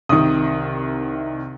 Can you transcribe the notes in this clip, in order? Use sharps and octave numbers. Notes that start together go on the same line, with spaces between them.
C2 C3 D#3 D#6